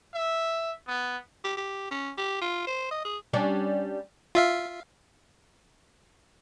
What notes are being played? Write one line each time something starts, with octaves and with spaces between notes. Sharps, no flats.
E5
B3
G4
G4
C#4
G4
F4
C5
D#5
G#4
G3 C#4 D4
F4 E5 F5